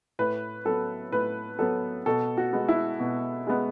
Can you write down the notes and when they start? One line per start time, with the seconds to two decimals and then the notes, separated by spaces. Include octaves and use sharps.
0.19 A2 B4
0.65 F#3 B3 A4
1.12 A2 B4
1.59 F#3 B3 A4
2.06 B2 A4
2.37 F#4
2.53 G#3 B3
2.68 E4
3.00 B2
3.47 G#3 B3